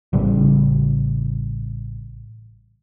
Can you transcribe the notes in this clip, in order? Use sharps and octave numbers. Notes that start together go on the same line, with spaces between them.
A1 C#3 G3